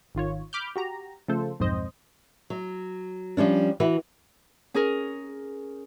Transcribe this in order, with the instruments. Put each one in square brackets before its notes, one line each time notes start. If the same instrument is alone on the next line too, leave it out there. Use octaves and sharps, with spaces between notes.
[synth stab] G#1 D#3 F4 C#5
B5 D6 F6 G6
F#4 G4 A#5
C#3 F3 A3 F4 A4 C5
B1 F2 G#2 C4 C5 D#5
[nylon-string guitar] F#3
F3 G3 C#4 D4
E3 F#4 B4
[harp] C#4 G#4 A#4